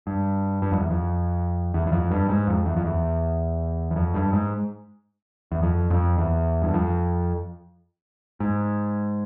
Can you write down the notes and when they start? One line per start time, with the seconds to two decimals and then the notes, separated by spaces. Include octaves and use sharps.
0.07 G2
0.62 G2
0.72 F2
0.81 E2
0.91 F2
1.74 E2
1.87 E2
1.92 F2
2.11 G2
2.29 G#2
2.47 F2
2.66 E2
2.77 F2
2.85 E2
3.91 E2
3.96 F2
4.14 G2
4.33 G#2
5.52 E2
5.63 F2
5.90 F2
6.18 E2
6.62 G2
6.74 F2
8.40 G#2